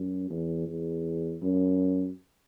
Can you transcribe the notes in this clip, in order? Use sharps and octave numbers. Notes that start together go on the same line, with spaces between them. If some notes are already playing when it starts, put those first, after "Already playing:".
Already playing: F#2
E2
E2
F#2